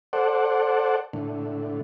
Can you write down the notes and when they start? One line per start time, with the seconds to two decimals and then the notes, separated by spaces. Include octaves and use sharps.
0.13 A4 C5 D5 F#5
1.13 A2 D3